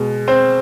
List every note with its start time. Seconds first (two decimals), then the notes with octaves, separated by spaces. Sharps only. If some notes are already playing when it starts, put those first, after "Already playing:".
Already playing: B2 G#3
0.28 C4 C5